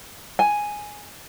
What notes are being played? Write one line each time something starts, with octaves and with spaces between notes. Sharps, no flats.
G#5